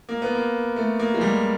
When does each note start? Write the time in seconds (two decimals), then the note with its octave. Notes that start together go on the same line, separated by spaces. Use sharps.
0.09 A#3
0.22 B3
0.35 A#3
0.76 A3
0.99 A#3
1.14 G#3
1.21 G3